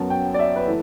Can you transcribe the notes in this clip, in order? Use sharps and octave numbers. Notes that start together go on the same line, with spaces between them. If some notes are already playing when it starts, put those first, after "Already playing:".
Already playing: F#2 F#3 B3 A5
G5
D5
E5
B4
E3 A3